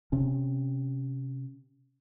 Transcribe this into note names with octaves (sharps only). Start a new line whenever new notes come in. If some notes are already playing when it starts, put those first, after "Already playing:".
C3 C4 C#4